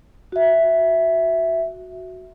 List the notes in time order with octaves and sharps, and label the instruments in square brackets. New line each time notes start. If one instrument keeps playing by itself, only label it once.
[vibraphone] F#4 E5